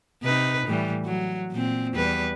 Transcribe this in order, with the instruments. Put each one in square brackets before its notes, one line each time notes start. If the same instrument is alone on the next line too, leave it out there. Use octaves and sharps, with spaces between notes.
[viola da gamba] C3 D#4 B4
A2 E3 G3
F#3
A#2 C4
E2 G3 B4